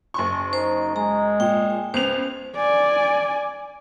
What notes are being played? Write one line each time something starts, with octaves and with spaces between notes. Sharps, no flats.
F#1 C6 C#6
D#4 C5
G#3 A#5
A#2 G5
C#2 B3 C5 F7
D5 G#5